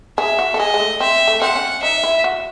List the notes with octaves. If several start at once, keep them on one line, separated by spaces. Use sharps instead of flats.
G#4 E5
F#4
A4
G#4 D#5
G#3
A3
C4 E5
A3
C4 F#5
C#4
D#4 E5
E4
F#4